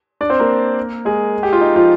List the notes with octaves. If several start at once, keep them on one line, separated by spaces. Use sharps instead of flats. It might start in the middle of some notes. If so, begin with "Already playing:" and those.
D4 D5
C4 C5
A#3 A#4
G#3 G#4
G4
F4
D#4
F3 F4